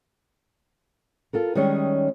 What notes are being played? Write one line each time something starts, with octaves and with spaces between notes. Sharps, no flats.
F4 A4 A#4
D#3 G3 G#3 C#4 C#5 D#5